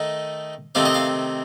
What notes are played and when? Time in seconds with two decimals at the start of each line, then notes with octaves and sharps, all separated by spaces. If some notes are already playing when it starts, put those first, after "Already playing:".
Already playing: D#3 A3 D#4
0.75 C3 D#3 A3 C4 F5
0.85 D#5
0.95 F5